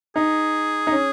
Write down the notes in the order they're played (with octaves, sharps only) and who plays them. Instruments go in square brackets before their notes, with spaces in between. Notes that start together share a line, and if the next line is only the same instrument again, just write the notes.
[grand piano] D#4 [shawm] G#4
[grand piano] D#4
C#4